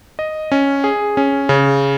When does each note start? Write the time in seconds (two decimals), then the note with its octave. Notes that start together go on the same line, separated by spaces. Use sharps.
0.19 D#5
0.52 C#4
0.84 G#4
1.17 C#4
1.49 C#3